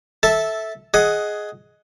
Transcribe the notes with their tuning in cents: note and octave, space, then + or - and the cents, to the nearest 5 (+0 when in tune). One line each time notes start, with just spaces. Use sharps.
A4 +0 E5 -10 A5 +0
G#4 +10 D#5 +0 F#5 +0